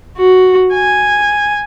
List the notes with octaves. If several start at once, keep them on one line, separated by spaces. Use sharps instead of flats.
F#4
G#5